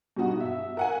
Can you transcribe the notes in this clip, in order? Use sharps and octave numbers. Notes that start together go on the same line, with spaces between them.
G2 B2 D#4 F#4
E5
A#4 F#5 G#5